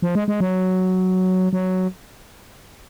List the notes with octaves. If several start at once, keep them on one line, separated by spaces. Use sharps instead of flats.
F3
G#3
G#3
F#3
F#3